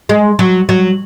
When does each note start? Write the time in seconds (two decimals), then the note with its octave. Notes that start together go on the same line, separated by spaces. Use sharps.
0.09 G#3
0.39 F#3
0.69 F#3